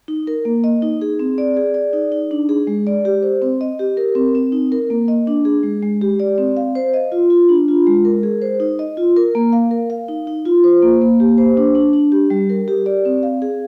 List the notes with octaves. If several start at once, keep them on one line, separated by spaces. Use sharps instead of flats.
D#4
A#4
A#3
D#5
D#4
G#4
C4
D5
G#4
D5
D#4
D#4
D4
G#4
G#3
D5
G4
C5
C4
D#5
G4
A#4
C4
C4
D#4
A#4
A#3
D#5
D4
G#4
G#3
G#3
G4
D5
C4
F5
C5
D#5
F4
F4
D4
F4
G#3
A#4
G#4
C5
D#4
D#5
F4
A#4
A#3
F5
A#4
F5
D#4
D#4
F4
C5
A#3
A#3
G4
C5
D4
D4
D4
G4
G3
A#4
G4
D5
C4
F5
G#4